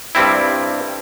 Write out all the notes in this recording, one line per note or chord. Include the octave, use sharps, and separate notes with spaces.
G2 G3 C4 E4